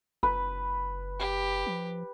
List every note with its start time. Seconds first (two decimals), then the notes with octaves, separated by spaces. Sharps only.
0.23 F#1 B4
1.19 G4
1.66 F3